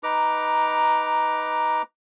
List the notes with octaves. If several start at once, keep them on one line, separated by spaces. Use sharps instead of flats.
D#4 B4 A#5 D6